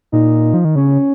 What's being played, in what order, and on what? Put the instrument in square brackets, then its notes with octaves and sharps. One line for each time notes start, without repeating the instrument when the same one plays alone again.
[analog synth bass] A#2 [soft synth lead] D#4
[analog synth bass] F3
D#3
[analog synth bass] C#3 [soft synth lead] C#4